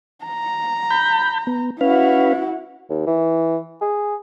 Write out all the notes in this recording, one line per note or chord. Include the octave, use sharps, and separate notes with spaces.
A#5
B5 G6
B3
C#4 E4 F#4 B4 F5
D#2
E3
G#4